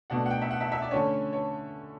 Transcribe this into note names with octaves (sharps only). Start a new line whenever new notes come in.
B2 A3 D4 F#5
F#5
G5
E5
F#5
E5
E5
D5
D3 A3 C#4 C#5
C#5